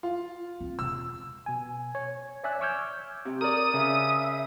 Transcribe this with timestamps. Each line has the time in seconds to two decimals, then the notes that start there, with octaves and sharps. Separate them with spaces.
0.03 F4
0.60 C4
0.79 E1 E6
1.46 B2 G#5
1.95 C#5
2.44 C#5 D5 E5 G#5 E6 F#6
2.61 C#6 D6 E6 F6 G6 G#6
3.25 C3
3.41 A#4 D5 D#6
3.74 C#3 E5